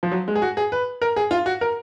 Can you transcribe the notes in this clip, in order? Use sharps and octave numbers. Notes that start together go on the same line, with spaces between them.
F3
F#3
G#3
G#4
F#4
G#4
B4
A#4
G#4
F4
F#4
A#4